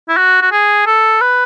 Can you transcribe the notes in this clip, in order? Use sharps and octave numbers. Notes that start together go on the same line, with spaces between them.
E4
F#4
F#4
G#4
A4
B4